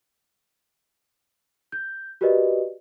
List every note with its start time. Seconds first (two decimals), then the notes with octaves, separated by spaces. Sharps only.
1.72 G6
2.21 F#4 G4 A#4 B4 D5 D#5